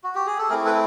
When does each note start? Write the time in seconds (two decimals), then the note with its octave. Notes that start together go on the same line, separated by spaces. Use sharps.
0.04 F#4
0.15 G4
0.26 G#4
0.39 A4
0.49 A3 C4 E4 G#4 A#4
0.65 A4 B4